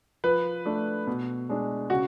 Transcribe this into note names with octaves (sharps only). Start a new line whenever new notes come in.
F3 B4
A3 D4
B2
G#3 D4
C#3 F#4